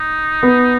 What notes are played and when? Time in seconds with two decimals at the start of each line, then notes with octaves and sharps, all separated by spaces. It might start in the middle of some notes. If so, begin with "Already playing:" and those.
Already playing: D#4
0.43 B3